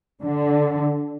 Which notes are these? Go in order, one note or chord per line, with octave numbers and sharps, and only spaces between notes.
D3